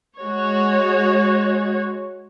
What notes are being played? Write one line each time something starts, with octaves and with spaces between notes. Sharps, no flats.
G#3 F#4 C#5